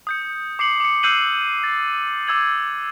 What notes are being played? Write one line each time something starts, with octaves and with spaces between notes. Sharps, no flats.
D#6 G6 C#7
D6 C7 C#7 F#7
D6 C#7
E6 F#6 G6 C7 D#7 F#7
A6
D6 E6 G#6 F#7